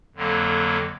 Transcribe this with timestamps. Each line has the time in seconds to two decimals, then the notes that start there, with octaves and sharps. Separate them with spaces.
0.16 F2 D3 F#3 A#3